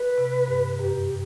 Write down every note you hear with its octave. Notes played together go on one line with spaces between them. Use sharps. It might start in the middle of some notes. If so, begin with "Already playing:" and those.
Already playing: B4
C3
G2
F#2 G4